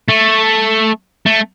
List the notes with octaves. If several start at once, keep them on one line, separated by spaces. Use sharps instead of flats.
A3
A3